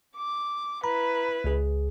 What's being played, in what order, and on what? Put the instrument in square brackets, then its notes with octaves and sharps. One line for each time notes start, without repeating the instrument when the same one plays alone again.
[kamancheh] D6
[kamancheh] E4 B4 [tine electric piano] A#5 B5
[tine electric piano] C#2 G#4